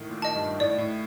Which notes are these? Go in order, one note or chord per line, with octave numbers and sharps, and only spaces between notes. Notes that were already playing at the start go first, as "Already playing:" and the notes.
Already playing: A2 D#3
A#2
D#5 A5
G2
A2 D5
A2